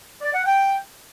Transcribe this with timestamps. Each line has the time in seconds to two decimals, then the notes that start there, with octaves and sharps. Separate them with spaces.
0.22 D5
0.34 F#5
0.46 G5